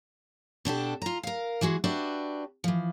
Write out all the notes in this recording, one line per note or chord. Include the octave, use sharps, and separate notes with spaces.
B2 D4 G4 A4
F4 A#5
A#4 F5
E3 G#3 F#4 G#4
D4 F#4 G4 B4 D5 E5
E3 F3